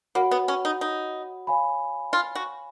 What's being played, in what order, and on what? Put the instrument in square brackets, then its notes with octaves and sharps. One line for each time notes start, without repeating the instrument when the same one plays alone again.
[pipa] A#3 [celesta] F#4 C#5 F#5 B5
[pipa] B3
C#4
D#4
D#4
[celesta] C#5 F5 G#5 B5
[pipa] F4
F#4